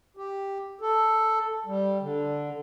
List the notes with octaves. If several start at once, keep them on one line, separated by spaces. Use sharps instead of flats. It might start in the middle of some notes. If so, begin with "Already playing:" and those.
G4
A4
G3
D3